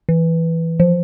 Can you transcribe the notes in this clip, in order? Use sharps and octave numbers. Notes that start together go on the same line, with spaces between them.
E3
F3